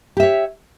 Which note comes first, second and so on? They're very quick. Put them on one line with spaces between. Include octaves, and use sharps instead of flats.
G4 E5 C#5